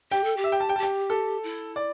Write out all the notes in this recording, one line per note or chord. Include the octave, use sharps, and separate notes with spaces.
G4 G5
A4
G4
E5
G5
A5
G5
G4 A5
G5
A4
E4
D5